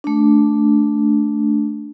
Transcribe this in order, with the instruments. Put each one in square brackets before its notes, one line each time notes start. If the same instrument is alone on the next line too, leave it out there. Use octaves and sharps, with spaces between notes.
[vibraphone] A3 D4